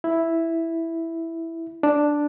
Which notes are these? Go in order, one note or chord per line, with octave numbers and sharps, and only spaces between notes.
E4
D4